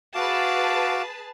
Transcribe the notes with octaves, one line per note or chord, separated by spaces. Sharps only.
F#4 G#4 B4 F5 A5 D6